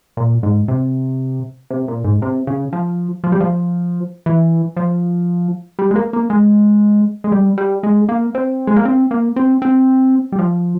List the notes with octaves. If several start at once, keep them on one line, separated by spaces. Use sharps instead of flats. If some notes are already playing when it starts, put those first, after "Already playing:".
A#2
G#2
C3
C3
A#2
G#2
C3
C#3
F3
F3
G3
F3
E3
F3
G3
G#3
A#3
A#3
G#3
G#3
G3
G3
G#3
A#3
C4
G#3
A#3
C4
A#3
C4
C4
G3
F3